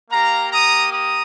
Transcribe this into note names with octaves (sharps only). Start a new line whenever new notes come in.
A#3 G4 F5 A#5
A#5 D#6
A#5 D#6